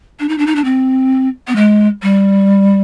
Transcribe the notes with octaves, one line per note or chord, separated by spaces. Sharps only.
D4
D#4
D4
D#4
D4
C4
B3
G#3
G3